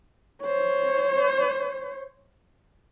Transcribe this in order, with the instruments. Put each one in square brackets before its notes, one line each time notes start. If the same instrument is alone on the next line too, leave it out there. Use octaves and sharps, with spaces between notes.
[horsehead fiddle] C5 C#5